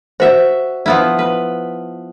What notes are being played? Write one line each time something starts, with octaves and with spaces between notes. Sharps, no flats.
F#4 C5 E5
F3 B3 E4
B4